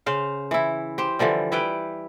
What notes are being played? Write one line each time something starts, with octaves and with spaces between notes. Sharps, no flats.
C#3 C5 F5
E3 E4
G4 C5
D3 E3 F3 G3
G3 E4 B4 G5